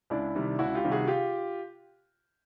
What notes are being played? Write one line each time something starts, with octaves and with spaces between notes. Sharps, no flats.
C#2 D4 E4
C3 D#3 G3
C#2 E4 F#4
F4 G4
C3 D#3 G3
F#4 G#4
F4 G4